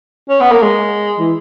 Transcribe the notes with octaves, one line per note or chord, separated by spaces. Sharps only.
C#4
B3
A#3
G#3
E3